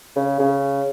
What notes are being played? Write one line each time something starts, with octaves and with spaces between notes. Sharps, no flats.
C#3
C#3